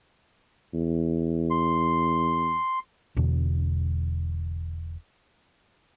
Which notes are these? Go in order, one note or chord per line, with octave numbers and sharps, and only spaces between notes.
E2
C6
E1 E2 B2 D3